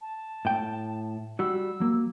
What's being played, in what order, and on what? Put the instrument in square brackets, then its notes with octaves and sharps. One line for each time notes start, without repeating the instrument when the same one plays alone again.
[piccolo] A5
[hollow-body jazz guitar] A2 G5
[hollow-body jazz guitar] G3 F#4 [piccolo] E6
[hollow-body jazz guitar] F#3 A#3